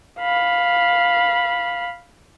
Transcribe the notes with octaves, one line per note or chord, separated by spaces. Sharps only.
F5 B5